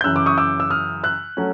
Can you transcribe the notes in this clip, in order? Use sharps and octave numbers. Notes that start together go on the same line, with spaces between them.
G6
F#2 C#3 E3 E6 F#6
D6 E6
C#6 D#6
D6 E6
E6
D#6 F6
E6 F#6
F#3 A3 C#4